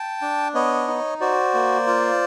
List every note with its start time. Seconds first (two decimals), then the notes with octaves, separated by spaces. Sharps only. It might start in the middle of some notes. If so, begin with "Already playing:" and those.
Already playing: G5 A5
0.22 D4
0.54 B3 C#5 D#5
0.88 D#4
1.21 F#4 C5 D5
1.54 A#3
1.87 F4